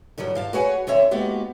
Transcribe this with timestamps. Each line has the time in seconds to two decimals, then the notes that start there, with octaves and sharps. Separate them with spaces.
0.18 G2 D3 D#3 F#3 G3
0.35 G2 F5 A5
0.53 F#4 G#4 B4 C#5 F#5 G#5
0.87 D#2 D3 C4 C#5 E5
1.11 G#3 A#3 B3 D#4 F#4 G4